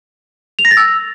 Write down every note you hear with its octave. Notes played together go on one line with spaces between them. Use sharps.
F7
A#6
A6
E6